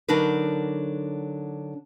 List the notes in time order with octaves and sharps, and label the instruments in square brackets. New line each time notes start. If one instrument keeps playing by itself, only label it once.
[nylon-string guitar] D3 F#3 D4 D#4 A#4 B4